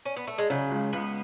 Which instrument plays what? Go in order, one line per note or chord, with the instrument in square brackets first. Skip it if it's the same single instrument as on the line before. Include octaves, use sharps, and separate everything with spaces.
[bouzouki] C#4
B3
A3
G#3
[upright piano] C#3 [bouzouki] F#3
[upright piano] C#2
[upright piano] C#2 [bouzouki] B3